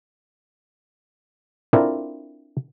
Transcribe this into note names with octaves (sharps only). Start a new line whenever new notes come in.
C4 D4 E4 F4 A4 A#4